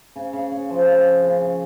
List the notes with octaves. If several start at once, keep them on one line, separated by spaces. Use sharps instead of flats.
C#3
C#3
C#3
F3
C#3
C#3
C#3
C#3